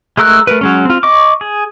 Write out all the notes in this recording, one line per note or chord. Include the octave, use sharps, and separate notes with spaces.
G#3 A3 A#4 E6 F#6
A3 A#4 B4
F#3 G#3 C#4
C4 F4
D#5 C#6 D6
G#4